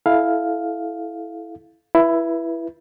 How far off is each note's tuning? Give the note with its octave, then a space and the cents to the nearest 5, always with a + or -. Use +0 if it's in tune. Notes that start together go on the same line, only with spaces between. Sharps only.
E4 +0 A4 -25 F5 +5
E4 +15 B4 -20